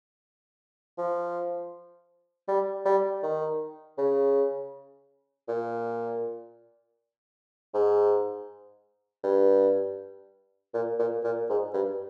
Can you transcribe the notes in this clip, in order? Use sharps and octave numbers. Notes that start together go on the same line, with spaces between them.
F3
G3
G3
D#3
C#3
A#2
G#2
G2
A#2
A#2
A#2
G#2
G2